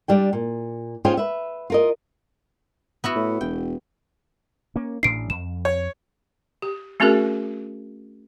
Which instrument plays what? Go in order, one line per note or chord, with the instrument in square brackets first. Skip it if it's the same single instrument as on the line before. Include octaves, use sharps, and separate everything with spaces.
[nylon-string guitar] G3 D4 G5
A#2
C#4 D#4 F4 G#4 C5 G5
B4 E5
F4 A#4 D#5
[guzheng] B3 E4 F#4
[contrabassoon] A2
[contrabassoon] E1 [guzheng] G5
[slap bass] A#3 C#4
[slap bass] A1 A2 D4 [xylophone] C7 D7
[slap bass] F2 [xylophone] E7
[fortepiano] C#5
[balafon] G4
A3 C4 C#4 F#4 G#4 A#4